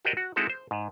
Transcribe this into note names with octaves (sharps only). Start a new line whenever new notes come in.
F#4 G4 A#4 C5 D5 D#5
F#4
G#3 C4 D#4 E4 F#4 A4
C5
G#2